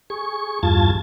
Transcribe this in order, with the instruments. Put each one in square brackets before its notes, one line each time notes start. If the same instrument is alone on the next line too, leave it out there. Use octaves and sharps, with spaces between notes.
[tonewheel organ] G#4 C#6
E2 G2 F4 A5 G#6 A6